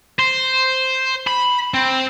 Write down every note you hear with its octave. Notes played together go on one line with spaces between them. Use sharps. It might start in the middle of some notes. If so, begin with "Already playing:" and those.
C5
B5
C4